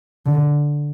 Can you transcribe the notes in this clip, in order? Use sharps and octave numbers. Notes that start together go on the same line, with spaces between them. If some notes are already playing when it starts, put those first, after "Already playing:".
D3